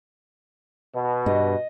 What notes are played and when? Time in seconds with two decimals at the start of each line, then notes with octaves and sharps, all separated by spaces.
0.95 B2
1.26 G2 D#5